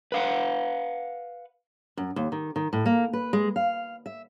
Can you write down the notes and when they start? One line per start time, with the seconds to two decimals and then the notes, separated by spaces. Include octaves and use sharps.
0.12 B4 F5 F#5
1.97 F#2
2.16 D#2
2.32 D#3
2.56 D#3
2.73 A2
2.86 A#3
3.13 B4
3.33 G#3
3.56 F5
4.06 E5